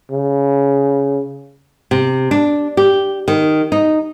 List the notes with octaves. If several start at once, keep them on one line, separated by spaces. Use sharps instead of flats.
C#3
C3
D4
G4
D#3
D#4